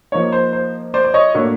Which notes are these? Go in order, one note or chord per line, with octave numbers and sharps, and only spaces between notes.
F3 A#3 D#4 C#5
C5
C5
C5 D5
D5
C#5 D#5
A2 F#3 A#3 D4 C#5